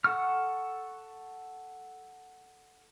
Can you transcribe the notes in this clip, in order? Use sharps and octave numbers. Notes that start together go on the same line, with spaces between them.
A4 F#5 C#6 F6